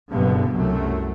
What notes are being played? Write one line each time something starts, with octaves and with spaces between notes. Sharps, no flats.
F#1 G2 B2 D3 B3
C2 F#2 A3